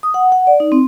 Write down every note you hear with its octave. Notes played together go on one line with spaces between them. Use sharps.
D#6
F#5
F#5
D5
D#4
C4